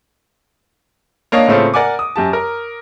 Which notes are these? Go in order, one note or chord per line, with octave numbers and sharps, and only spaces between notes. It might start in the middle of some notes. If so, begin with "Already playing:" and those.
A#3 D4 C#5 D#5 F5
A2 C#3 A3 C4 C#4 F4
A#4 D5 F#5 G#5 D6
D#6
F#2 G4 A5
A#4